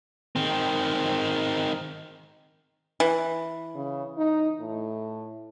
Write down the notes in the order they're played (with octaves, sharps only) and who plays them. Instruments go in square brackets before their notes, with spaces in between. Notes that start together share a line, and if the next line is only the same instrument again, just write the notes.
[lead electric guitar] D#3 C4
[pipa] E3
[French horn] C#3
D#4
A2